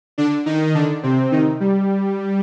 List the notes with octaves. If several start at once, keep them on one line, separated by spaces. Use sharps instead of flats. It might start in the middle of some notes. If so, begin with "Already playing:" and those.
D3 D4
D#3 D#4
D3 D4
C3 C4
D#3 D#4
G3